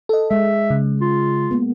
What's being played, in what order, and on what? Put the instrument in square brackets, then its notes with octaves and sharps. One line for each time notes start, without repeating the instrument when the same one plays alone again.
[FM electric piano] A4 D#5
[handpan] G#3 [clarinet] E5
[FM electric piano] C#3
[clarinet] F4
[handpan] A#3 B3